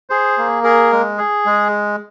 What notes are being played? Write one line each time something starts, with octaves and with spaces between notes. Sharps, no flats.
G#4 C5
A#3
G#4 A#4
G#3
G#4
G#3